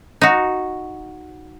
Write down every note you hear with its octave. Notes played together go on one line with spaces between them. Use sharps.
D#4 F#4